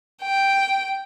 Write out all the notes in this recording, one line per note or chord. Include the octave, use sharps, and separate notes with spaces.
G5